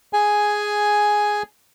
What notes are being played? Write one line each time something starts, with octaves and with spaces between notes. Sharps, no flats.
G#4 G#5